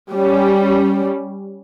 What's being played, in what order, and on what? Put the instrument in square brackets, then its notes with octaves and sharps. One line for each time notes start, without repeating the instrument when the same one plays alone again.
[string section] G3 C#4